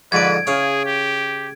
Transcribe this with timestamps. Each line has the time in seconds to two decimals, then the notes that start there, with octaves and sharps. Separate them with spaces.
0.12 F2 G#2 D3 B4 G#6 D7
0.47 C#3 E4 G#4 C#5 F5
0.85 G4